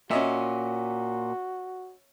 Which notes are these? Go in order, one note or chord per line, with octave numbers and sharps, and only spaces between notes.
A#2 C#4 F#4 D#5 E5